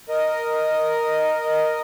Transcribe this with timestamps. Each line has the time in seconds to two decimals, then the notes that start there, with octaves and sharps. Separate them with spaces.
0.09 A#4 D#5